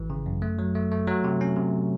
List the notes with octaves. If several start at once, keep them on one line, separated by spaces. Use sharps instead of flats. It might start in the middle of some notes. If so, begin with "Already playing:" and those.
Already playing: G#1 E3
C#3
F#2
A3
F#3
A3
A3
F#3
C3
C#4
C3